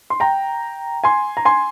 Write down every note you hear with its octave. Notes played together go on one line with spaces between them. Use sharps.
C6
G5 A#5
G#5 C6
A#5
G#5 C6